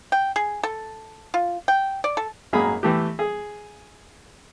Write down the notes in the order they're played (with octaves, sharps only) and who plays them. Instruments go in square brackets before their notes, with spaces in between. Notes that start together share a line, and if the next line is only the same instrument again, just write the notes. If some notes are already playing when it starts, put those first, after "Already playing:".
[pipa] G5
G#4
A4
F4
G5
D5
A4
[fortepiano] G#1 F#2 A#3 G#4 A#5 B5
E3 A3 G4
G#4